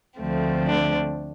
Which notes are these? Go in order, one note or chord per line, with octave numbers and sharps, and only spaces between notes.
D2 D3 F3 A3 C4
D4